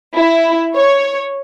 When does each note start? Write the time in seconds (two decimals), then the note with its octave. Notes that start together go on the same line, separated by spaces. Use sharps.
0.18 E4
0.77 C#5